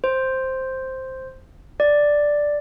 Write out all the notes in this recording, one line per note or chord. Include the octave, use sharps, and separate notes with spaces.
C5
D5